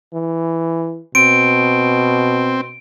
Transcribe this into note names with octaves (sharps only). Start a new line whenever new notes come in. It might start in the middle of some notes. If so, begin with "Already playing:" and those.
E3
B2 C4 D7